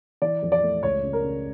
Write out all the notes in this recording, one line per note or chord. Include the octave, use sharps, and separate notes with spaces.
E3 D5
F2
D5
A3
C#2 C#5
C#3
A#4
C#3